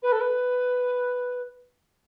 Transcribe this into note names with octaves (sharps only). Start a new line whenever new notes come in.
B4
A4
B4